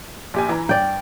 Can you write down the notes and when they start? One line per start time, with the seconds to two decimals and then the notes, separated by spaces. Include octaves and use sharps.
0.34 A#1 G4 G#5
0.49 E3 A#5
0.69 G2 D5 G5